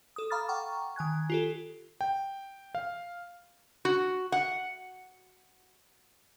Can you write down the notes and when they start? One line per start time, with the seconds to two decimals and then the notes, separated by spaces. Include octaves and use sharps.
0.16 A4 D#6
0.30 F5 A#5 B5 D6 F6 A6
0.49 F#5 G5 A#5 C#6
0.96 D#3 G#5 F#6 G#6
1.30 F4 G4 A4
2.01 G5
2.75 F5
3.85 F#4
4.32 F#5